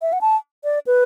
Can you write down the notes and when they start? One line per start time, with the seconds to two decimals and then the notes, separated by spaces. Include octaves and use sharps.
0.02 E5
0.13 F#5
0.21 A5
0.64 D5
0.87 B4